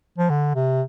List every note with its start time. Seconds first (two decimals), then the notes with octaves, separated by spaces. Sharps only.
0.18 F3
0.30 D3
0.55 C3